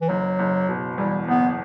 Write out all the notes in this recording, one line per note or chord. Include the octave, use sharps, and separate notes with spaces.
E3
F#1 F#3
F#1
B2
E2 G3
F#1 B3